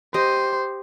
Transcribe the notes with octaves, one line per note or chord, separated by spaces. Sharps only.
G4 C5 D#5